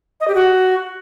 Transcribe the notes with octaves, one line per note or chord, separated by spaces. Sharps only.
D#5
G4
F#4